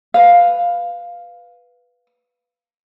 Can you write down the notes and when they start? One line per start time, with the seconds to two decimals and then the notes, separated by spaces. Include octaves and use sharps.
0.14 B4 F5